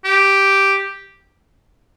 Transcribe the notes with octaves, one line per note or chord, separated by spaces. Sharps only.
G4